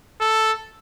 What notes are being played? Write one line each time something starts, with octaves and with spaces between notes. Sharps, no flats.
A4